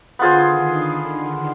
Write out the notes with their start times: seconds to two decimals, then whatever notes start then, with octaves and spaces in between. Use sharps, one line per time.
0.19 D3 B3 F4 G#4 C5
0.50 D#3